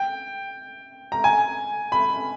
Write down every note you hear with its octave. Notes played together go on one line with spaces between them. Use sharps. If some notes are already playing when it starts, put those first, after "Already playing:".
Already playing: G5
A#5
G#5
B5